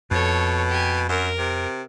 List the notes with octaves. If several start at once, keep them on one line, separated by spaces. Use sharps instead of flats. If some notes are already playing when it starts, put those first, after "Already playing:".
F2 B2 A4 C#5
G4 G#5
F#2 A#4
C3